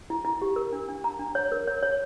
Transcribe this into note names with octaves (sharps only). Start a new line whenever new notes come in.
E4
E4
G4
A#4
D4
D4
A#5
D4
C#5
A#4
C#5
C#5